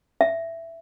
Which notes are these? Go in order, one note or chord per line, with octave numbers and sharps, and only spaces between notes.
E5